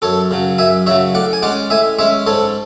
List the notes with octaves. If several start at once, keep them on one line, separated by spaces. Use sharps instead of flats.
F#2 A4 C#5
C#3 F#3
F#2 E5 G#5
C#3 F#3 C#5 E5
A2 D5 F#5
G#5
G#3 C#4 D5 F#5
A2 E5 G#5
G#3 C#4 C#5 E5
G#2 A4 C#5